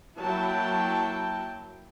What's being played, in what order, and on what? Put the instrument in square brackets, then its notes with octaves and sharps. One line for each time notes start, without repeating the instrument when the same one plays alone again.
[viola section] F#3 A#3 E4 G5 A5